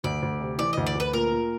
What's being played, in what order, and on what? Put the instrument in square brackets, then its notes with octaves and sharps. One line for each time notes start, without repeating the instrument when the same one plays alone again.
[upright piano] D2 [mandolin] D5
[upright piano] D2
C3
[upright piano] E3 [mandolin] D5
[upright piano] D2 [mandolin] D#5
[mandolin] D5
[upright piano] D2 [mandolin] B4
[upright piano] A#2 [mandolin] A#4
[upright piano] A#2